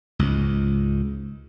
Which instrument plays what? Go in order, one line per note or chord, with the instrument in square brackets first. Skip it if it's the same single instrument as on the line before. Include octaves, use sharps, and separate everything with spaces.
[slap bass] C#2 G#2